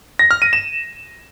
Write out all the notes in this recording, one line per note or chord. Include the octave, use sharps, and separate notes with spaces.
A#6
F6
D#7
E7